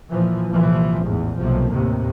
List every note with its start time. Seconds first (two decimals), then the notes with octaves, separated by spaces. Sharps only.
0.10 A#2 E3 F3
0.53 C2 A#2 E3 F3
1.03 A1 E2 G#2
1.40 B1 C3 F3 A3 A#3
1.71 D#2 A2 C3